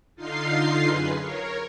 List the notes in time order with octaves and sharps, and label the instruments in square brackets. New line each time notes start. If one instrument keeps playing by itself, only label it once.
[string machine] D3 D#4 F4 F5 C6 C7
F#2 G#4 B4
A#4 C#5